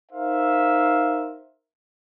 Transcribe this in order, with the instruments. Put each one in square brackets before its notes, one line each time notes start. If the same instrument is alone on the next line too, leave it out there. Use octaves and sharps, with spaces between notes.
[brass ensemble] D#4 A#4 C5 E5 F5